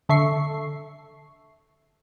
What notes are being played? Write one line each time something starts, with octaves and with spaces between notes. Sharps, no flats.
D3 A4 E5 C#6 C7